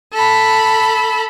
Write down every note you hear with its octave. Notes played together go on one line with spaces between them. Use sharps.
A4 B5